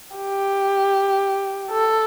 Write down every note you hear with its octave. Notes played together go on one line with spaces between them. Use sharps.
G4
A4